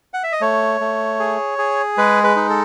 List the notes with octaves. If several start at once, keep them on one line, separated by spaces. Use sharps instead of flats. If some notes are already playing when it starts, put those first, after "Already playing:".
F#5
E5
D#5
A3 C#5
A3
G#4
G#4
G#3 B4
B4
D#4
A4